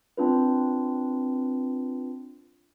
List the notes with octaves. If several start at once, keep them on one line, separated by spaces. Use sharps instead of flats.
C4 D4 F4 B4